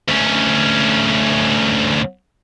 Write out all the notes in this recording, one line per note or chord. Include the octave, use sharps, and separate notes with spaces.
D2 C#4